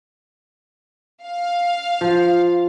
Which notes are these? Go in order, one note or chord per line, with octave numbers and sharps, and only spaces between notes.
F5
F3